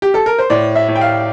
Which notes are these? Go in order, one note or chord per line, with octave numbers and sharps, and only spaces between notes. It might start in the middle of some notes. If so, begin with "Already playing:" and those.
G4
A4
A#4
C5
A2 D5
E5
A2
G5
F5